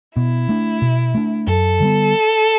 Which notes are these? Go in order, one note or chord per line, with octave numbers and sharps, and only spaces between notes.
B2 E4
A3 D4
B2
A3 D4
F#2 A4
D3 G3 B3